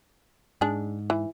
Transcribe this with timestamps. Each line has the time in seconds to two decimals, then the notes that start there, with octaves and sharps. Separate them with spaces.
0.61 G#2 D4 G#4
1.10 E3